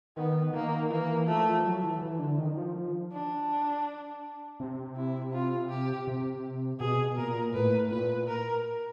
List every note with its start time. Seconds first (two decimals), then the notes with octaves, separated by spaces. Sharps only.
0.17 D#3 B3
0.53 D#3 A#3
0.90 E3 A#3
1.27 F3 A3
1.65 F#3
1.83 E3
2.01 E3
2.19 D3
2.38 D#3
2.57 F3
2.75 F3
3.12 D4
4.60 C3
4.96 E4
5.33 F4
5.70 G4
6.07 C3
6.80 B2 G#4
7.17 A#2 A#4
7.53 A2 B4
7.90 A#2 B4
8.27 A#4